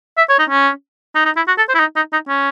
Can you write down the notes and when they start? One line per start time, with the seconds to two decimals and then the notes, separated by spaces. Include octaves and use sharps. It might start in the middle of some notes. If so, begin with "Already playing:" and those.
0.18 E5
0.29 C#5
0.39 D#4
0.50 C#4
1.15 D#4
1.25 D#4
1.36 E4
1.47 F#4
1.58 A4
1.69 C5
1.75 E4
1.79 D#4
1.96 D#4
2.13 D#4
2.28 C#4